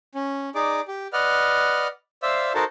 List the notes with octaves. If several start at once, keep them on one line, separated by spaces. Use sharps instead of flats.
C#4
D#4 G#4 D5 D6
G4
B4 D5 D#5 F#5 F6
C5 D5 E5 F5 E6
D#4 F#4 A4 A#4 C5 A5